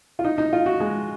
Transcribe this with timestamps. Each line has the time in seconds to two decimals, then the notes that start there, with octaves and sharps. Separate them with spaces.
0.19 F4
0.24 D#4
0.38 D#4
0.53 F4
0.66 F#4
0.80 G#3